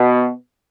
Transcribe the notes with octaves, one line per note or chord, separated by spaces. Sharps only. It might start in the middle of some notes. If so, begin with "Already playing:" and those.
Already playing: B2